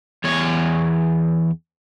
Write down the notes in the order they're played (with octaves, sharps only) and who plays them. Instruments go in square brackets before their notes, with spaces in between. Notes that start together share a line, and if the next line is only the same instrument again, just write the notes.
[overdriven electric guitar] E2 C#5